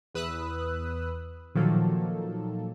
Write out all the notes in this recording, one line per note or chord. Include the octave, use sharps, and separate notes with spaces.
E2 B4 D#6 E6 F#6
A#2 D#3 F3 F#3 A#3 A4